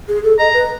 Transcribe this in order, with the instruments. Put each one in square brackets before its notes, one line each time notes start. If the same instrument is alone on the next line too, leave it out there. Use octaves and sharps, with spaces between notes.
[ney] G#4
A4
[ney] D#5 [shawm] A#5
[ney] B4